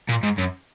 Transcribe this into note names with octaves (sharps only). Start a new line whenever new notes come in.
A#2
G#2
F#2